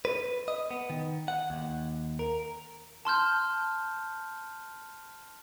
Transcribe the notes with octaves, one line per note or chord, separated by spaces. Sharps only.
B4
D#5
B3
D#3
F#5
D#2
A#4
A5 C6 F6 G6